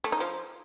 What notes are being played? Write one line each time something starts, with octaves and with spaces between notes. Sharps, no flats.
A3
D#4
F3